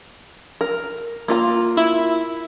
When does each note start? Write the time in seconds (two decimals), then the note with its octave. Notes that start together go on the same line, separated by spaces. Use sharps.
0.61 A#4
1.28 A#3 F4 A#5
1.77 E4